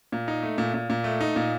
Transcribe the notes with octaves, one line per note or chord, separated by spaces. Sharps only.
A#2
D#4
A3
A#2
A#2
A#2
A3
D#4
A#2